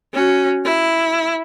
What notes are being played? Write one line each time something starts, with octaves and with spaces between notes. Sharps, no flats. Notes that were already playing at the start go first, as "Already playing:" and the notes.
C#4 F#4
E4